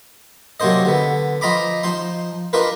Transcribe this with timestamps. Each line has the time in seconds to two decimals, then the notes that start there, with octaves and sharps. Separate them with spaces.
0.60 C3 F#3 A#3 D4 C5 D#5
0.85 D3 B3
1.41 F3 F4 D#5 A#5 B5 D6
1.83 F3 D#4 C6
2.53 D4 D#4 F4 A#4 B4